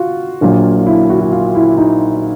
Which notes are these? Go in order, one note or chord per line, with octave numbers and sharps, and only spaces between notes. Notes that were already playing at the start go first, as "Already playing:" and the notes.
Already playing: F4 F#4
A#1 A#2 F#3
F4
E4
F#4
F#4
F4
E4
D#4